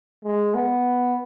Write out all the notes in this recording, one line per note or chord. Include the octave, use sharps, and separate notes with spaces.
G#3
B3